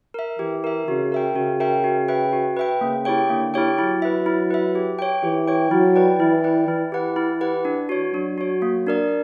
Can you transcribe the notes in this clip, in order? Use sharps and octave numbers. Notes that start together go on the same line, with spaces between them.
A#4 E5
E3 G4
A#4 E5
C#3 F#4
A#4 E5 G5
C#3 F#4
A#4 E5 G5
F#4
B4 E5 G5
F#4
B4 E5 G5
C#3 A#3
E4 G4 C#5 G5
D3 A#3
E4 G4 C#5 G5
F#3 E4
B4 E5
E4
B4 E5
G4
C#5 G5
E3 G4
C#5 G5
F#3 E4
B4 D5 G5
E3 E4
B4 D5 G5
E3 E4
G4 B4 F#5
E4
G4 B4 F#5
D4
F#4 C#5
F#3 D4
F#4 C#5
A#3
D4 A#4 D5